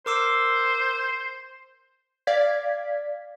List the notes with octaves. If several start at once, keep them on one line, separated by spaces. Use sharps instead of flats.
A#4 C5 D6 E6
D5 F5 G#6 B6